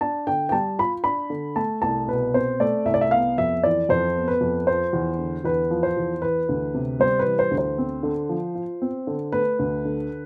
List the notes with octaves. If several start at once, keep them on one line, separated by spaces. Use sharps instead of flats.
D4 A5
D3 G5
G5
G3 A5
F4 B5
D4 B5
D3
A3 A5
C2 A5
B2 B4
C4 C5
A3 D5
C2 E5
D5
E5
B3 F5
F2 E5
E3 D5
F2 C5
B3
B4
F2
F3 C5
E2
D3
E2 B4
F3
C5
E2
E3 B4
D2
C3
G3 C5
B4
E3
C5
D2
C5
C4
D3
F3
F4
C4
D3
A3 B4
D2
D3